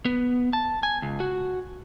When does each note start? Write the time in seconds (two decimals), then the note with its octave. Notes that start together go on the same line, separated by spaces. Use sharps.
0.05 B3
0.53 A5
0.83 G#5
1.02 C#2
1.20 F#4